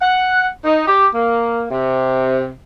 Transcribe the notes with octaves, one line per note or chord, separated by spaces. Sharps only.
F#5
D#4
G4
A#3
C3